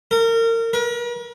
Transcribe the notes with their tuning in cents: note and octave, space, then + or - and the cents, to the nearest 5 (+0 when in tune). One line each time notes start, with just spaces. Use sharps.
A#4 -30
A#4 +45